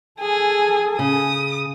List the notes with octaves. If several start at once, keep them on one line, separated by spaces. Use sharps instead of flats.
G#4 A4 G#5
C#3 D#6